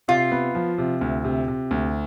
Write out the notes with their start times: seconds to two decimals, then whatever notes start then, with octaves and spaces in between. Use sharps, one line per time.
0.08 C3 F4
0.32 B3
0.55 F3
0.78 C3
1.01 D2
1.24 C3
1.48 C3
1.71 D2